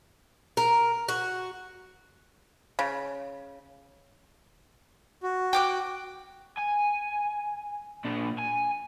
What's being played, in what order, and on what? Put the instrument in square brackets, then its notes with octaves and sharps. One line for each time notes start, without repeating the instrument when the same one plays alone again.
[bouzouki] A#4
F#4
[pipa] C#3
[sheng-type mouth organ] F#4
[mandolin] G5 D6 F#6
[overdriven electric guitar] G#5
A#2 D4
G#5